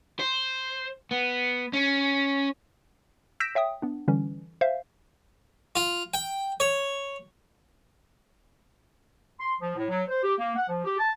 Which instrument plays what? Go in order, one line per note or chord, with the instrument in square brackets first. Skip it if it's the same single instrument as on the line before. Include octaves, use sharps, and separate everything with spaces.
[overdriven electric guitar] C5
B3
C#4
[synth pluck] E6 G6 A#6 B6 D7 E7
C#5 E5 G5 D#6
B3 D4
D3 E3 G3 C#4
C5 E5 F5
[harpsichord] F4
G5
C#5
[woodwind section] C6
F3
A2
F#3
C5
G4
A#3
F#5
F3
G4
A5